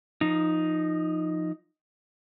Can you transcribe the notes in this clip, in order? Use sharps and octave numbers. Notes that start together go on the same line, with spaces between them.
F3 D#4